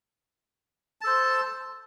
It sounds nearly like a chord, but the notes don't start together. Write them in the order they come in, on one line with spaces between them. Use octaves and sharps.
A5 A4 C5